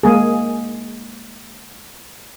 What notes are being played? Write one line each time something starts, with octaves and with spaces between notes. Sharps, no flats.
G#3 A#3 G#4